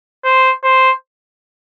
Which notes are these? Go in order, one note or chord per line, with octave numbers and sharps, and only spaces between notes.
C5
C5